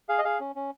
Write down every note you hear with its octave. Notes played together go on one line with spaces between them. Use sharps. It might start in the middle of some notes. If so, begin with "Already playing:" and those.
G#4 F5
D#5
G#4 F5
C#4
C#4